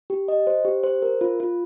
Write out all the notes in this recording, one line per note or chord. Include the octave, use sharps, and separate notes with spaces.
G4
D#5
C5
G4
C5
A#4
F4
F4